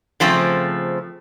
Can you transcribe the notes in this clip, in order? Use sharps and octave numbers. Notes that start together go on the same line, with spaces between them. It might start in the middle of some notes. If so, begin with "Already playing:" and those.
C#3 F3 A3 C4